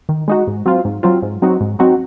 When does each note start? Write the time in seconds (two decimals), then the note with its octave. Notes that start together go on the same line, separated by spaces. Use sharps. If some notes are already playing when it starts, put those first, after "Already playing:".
0.09 D#3
0.28 G#3 D#4 F#4
0.47 G#2
0.66 F#3 C4 F4
0.85 G#2
1.03 F#3 C4 F4
1.22 G#2
1.42 F#3 C4 D#4 F#4
1.61 G#2
1.79 F#3 C4 D#4 F#4